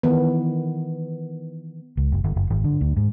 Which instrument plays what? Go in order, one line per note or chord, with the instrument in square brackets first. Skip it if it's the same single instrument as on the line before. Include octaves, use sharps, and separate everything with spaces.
[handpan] D#3 E3 B3
[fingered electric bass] C#2
F#1
G1
F#1
G#1
D3
D2
G#2